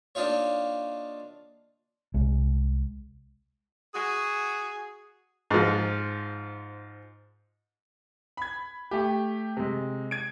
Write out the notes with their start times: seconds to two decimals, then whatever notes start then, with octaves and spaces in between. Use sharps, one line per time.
0.15 A#3 D4 D#4 F4 C#5
2.14 C2 G#3
3.94 F#4 G#4
5.51 G#2 F3
8.37 B5 G#6
8.91 A3 G4
9.57 C3 G#3
10.11 G#6 D7